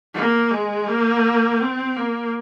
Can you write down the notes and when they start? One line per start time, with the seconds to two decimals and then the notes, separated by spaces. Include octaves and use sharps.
0.15 A#3
0.51 G#3
0.88 A#3
1.60 C4
1.97 A#3